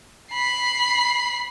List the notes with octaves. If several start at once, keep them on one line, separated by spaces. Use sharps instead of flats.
B5 C7